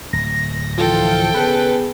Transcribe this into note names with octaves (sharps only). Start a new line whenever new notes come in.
D1 A#6
E3 F3 F4 A4 G5
C#3 B3 G#4 B4